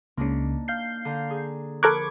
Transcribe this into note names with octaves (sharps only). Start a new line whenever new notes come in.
C#2 C#3 A#3 D4 D#4
F5 G6 C7
D3 A#5
G#4
F3 A4 A#4 B5 C#6 D6 F#6 G#6